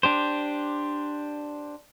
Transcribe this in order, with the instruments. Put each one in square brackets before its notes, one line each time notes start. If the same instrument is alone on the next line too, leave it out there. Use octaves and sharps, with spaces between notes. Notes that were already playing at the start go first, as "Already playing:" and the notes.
[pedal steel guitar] D4 G4 C5